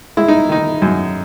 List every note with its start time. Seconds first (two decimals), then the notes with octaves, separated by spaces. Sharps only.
0.17 G#3 E4
0.28 D#4
0.49 D#3 D#4
0.82 F#2